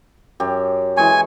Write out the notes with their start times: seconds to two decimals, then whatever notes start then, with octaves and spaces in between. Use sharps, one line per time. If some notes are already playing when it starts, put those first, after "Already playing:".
0.40 F#2 G4
0.97 E3 G#3 G#5 C#6